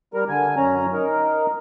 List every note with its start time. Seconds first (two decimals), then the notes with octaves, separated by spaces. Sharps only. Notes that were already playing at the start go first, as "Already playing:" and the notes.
0.14 G3 A#4
0.29 D3 G#5
0.57 F#2 C#4 A#5
0.93 D#4 A#4